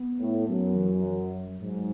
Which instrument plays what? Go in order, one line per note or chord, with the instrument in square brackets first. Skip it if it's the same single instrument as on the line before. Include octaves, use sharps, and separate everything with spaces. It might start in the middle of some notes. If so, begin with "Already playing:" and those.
Already playing: [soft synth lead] B3
[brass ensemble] A2
[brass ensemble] F#2 [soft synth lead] B3
[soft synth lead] E3
F#3
F#3
[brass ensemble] G#2 [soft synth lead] F#3